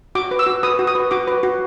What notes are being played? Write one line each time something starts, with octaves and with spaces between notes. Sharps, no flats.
F#4 D6
B4
E6
F#4
B4 D#6
F#4
D#6
B4
F#4 D6
B4
F#4